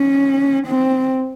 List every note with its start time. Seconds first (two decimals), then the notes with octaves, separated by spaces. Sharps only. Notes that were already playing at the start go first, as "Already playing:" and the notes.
Already playing: C#4
0.67 C4